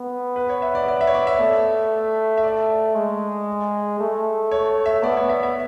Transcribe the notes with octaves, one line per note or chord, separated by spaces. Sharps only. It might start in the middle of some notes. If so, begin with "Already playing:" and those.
Already playing: B3
B4
C#5
E5
D5
D5
E5
C#5
D5
E5
A3
E5
D5
G#3
A3
C#5
E5
B3 D5
C#5
E5
E5